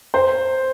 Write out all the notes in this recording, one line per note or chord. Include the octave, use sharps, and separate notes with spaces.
C5